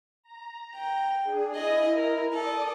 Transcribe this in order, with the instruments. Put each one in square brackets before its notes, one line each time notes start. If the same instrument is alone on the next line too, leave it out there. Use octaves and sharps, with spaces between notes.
[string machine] A#5
[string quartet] G5
[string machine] D4 G#4
[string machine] E4 [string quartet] G#4 D#5
[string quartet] A#4
[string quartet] A4 [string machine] D5 D#6